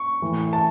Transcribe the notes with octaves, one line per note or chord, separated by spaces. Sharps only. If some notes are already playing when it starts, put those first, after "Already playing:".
Already playing: C#6
A2 E3
A5